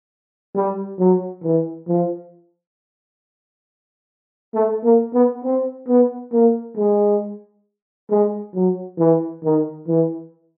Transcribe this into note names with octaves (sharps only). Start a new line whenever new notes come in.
G3
F#3
E3
F3
A3
A#3
B3
C4
B3
A#3
G#3
G#3
F#3
E3
D#3
E3